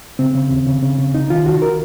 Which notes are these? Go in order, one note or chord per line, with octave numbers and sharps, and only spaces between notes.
C#3 C4
C#3
D#2
C#3
C#3
C#3
C2 D#4
D#3 F4
C2 F#4
A#4